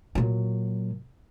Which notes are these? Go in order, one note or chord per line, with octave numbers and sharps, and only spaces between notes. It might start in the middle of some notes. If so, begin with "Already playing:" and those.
A#2 F#3